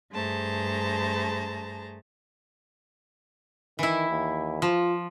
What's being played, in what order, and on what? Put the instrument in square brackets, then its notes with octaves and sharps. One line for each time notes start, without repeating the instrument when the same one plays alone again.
[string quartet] G2 A3 G#4 C5 A5 A#5
[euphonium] D#3 [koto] E3 E4
[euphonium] D#2
[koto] F3 [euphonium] F4